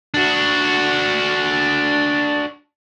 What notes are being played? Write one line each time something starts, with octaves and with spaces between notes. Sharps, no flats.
D4 F#4